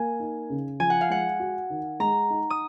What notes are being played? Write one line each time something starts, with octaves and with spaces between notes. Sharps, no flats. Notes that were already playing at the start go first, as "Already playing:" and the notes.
Already playing: A#3 G#5
D#4
C#3
F3 G#5
F#5
F5
G#3 F#5
F#4
D#3
G#3 A#5
D#4
D#6